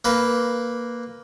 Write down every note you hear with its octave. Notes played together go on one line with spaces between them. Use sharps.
A#3 B4